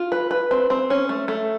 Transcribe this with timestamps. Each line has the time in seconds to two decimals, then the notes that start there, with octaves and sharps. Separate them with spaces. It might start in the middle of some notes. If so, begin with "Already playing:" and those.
Already playing: F4
0.12 B4
0.31 B4
0.51 C4
0.70 C4
0.90 C#4
1.09 A3
1.28 A3